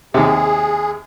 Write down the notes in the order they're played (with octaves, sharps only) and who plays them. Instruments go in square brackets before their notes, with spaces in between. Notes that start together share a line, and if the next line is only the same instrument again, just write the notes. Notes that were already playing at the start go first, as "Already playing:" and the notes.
[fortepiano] D#2 C3 [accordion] G#4